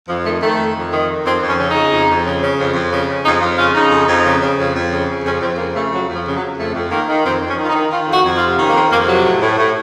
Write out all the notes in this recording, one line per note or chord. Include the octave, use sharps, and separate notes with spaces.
F2 F3
D#3 A3
D#3 A3
F2
F2
D#3
D#3
F2 C4
F2
C#4
C#3
D#4
C#3
F2
F2
C#3
C#3
F2
F2
C#3
C#3
F2 D#4
F2 F4
C#3 F4
C#3 D#4
F2
F2
C#3
C#3
F2
F2
C#3
C#3
F2 C#4
F2 C4
C#3 A#3
C#3 A3
F2 F#3
F2
F3
C#3
F#3
C#3
F2 A3
F2
D#3 A#3
D#3
F2 C4
F2
C#4
D#3
F4
D#4
D#3
D#3 F4
F2
F#4
F2
F4
C3
D#3 C#4
A#3
F2 C4
F2 A#3
C3 F#3
A2
A2
A2